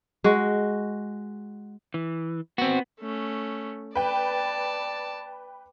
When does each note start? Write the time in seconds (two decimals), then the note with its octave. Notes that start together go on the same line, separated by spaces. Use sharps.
0.24 G#3 F#4
1.94 E3
2.58 B3 C4 F#4
3.00 A3 C#4
3.95 B4 D5 G5 A5